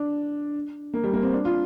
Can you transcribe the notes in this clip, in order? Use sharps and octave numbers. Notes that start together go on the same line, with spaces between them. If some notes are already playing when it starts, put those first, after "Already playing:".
Already playing: D4
A#3
G3
A#3
C4
D4
F4